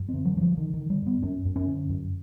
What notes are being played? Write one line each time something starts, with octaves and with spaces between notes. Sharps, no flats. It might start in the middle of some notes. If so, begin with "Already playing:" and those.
Already playing: F#2
C4
D3
F#3
D3 F#3
F3
D3 D#3
D#3
D3
G3
F#2 B3
F#2 C#4
F#2
C#4
D3
F#2